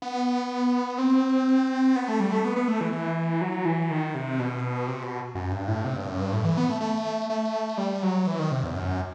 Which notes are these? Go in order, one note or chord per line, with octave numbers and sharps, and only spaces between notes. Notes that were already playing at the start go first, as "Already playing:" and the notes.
B3
C4
B3
A3
G3
A3
B3
B3
A3
E3
E3
F#3
E3
D#3
C3
B2
C3
B2
F#2
G2
A2
C3
G2
F#2
G2
A2
E3
B3
A3
A3
A3
G3
F#3
E3
D#3
C3
E2
F#2